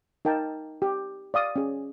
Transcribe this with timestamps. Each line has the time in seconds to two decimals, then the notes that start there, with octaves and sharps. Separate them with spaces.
0.25 D#4 A#4 G5 A5
0.82 G4
1.34 D5 F5 D#6
1.56 C#4 G#4